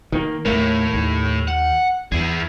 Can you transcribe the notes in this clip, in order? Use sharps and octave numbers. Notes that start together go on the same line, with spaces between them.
D#3 A#3
D#2 A2 A3 A#3
D#2
F#5
E2 E4 G#4